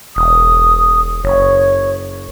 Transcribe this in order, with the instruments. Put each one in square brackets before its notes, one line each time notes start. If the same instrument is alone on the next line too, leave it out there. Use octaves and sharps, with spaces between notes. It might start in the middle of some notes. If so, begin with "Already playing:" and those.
[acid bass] E1 [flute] D#6
[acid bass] F#1 [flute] C#5